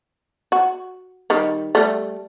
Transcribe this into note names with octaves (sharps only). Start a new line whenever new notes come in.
F#4
D#3 G3
G3 A3